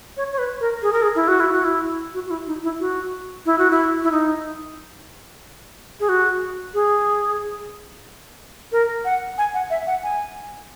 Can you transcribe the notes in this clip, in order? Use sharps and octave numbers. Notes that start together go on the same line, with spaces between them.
C#5
C#5
B4
A#4
G#4
A#4
G#4
E4
F#4
E4
F#4
E4
F#4
F#4
E4
D#4
E4
F#4
E4
F#4
E4
E4
D#4
G#4
F#4
G#4
A#4
F#5
G#5
F#5
E5
F#5
G#5